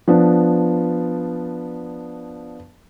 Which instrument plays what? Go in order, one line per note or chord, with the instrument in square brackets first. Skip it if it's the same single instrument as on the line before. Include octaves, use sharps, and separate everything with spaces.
[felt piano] F3 B3 D4